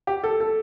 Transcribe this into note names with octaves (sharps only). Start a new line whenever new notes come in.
G4
A4
A4